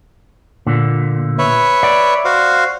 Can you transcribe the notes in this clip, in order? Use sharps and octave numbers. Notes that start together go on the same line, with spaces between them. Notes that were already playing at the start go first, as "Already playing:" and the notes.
A#2 D3
B4 C#5 E5
D5
F#4 C5 F5